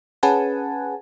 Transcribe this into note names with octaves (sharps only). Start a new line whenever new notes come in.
C#4 G#4 B4 F#5 G#5 A5